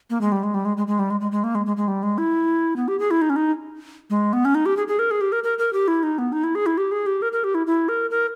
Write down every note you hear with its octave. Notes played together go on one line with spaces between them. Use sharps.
A#3
G#3
G3
G#3
G3
G#3
G#3
G#3
G3
G#3
G#3
G#3
A#3
G#3
G#3
G#3
G3
G#3
E4
B3
G4
G#4
E4
D#4
C#4
D#4
G#3
B3
C#4
D#4
G4
G#4
G#4
A#4
G#4
G4
A#4
A#4
A#4
G4
E4
D#4
B3
D#4
E4
G#4
E4
G4
G#4
G4
A#4
A#4
G4
E4
E4
A#4
A#4